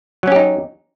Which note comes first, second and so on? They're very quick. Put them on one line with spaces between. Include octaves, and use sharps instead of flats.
F#3 C#4 G4 D#4